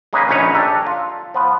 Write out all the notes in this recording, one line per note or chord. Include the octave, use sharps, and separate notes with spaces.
G#3 A#3 C#4 D#4 G#4 B4
A#1 C#4 D#4 B4 C#5
D4 G4 A4 A#5
F4
F3 B3 B4